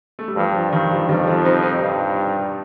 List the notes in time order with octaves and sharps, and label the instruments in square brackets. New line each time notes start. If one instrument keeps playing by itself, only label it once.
[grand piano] A3
G3
[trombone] G2 [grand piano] F3
[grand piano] F3
[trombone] G2 [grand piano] D#3
[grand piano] F3
[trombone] F2 [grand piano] D#3 G3
[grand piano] F3
C4 D#4
C4 D#4
[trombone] G2